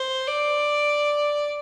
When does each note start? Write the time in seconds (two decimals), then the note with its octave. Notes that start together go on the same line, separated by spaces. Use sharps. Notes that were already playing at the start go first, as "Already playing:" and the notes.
Already playing: C5
0.28 D5